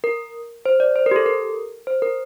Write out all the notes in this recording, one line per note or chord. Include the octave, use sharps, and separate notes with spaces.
A#4
C5
D5
C5
A#4
G4
A4
A#4
C5
A#4